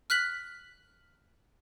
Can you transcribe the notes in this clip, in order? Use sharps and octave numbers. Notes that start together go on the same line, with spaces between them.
F6 F#6 B6 F#7